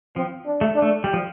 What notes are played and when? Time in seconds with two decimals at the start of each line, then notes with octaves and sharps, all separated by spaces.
0.16 F3 C4
0.46 D4
0.61 A3
0.75 D4
0.82 A3
1.04 G3
1.13 F3